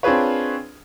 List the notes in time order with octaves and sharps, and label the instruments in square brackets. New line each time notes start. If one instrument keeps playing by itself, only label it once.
[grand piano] C4 D4 F4 G#4 B4 C#5